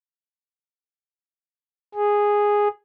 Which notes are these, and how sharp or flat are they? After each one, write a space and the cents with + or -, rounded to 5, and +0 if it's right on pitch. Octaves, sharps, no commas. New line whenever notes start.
G#4 -5